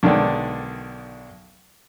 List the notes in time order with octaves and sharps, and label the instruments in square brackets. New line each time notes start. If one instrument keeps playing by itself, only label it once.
[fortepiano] B1 D3 D#3 G#3 D5 G5